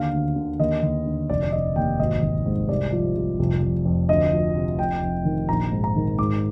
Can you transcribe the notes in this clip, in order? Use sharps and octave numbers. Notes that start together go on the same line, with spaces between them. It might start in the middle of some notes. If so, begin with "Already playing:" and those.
Already playing: D#2 D3 F5
D2
D3
D#2 D#5
D#2
D3
F1 D5
D5
F1 D#5
D#2 G5
G#1 D#5
G#1
G#2
C2 D5
F3
C2
F1
F1
F2
D2 D#5
F3
C3
F1 G5
F1
D#3
A#1 A#5
G#2
A#5
D#3
G#2 D6